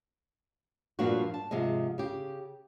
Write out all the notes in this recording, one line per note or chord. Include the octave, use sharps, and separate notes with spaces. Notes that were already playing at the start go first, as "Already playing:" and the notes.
G2 A#2 F3 A#3 D4 F#4
A5
G#2 C3 F3 G#4 D#5
C#3 G4